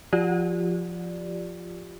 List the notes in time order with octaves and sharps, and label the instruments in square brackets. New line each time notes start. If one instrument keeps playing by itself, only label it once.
[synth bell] F3 F4 G4 D5